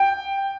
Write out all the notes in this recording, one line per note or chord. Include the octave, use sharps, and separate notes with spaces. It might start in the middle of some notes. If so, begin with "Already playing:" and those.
Already playing: G5